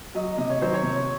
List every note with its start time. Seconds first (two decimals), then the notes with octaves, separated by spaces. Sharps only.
0.15 F#3 D#5
0.38 C3 D#5
0.50 C#5
0.61 D#3 F#3 C5
0.74 C#5
0.83 C3